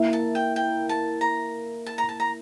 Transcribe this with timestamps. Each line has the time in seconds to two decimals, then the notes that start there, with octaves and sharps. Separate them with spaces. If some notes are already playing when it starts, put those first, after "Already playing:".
Already playing: A#3 E4 A#4 E5
0.13 A5
0.35 G5
0.56 G5
0.89 A5
1.21 A#5
1.86 A5
1.98 A#5
2.09 A5
2.20 A#5